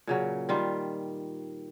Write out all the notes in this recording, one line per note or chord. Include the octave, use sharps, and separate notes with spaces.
A#2 C#3 F#3
D#3 G3 F4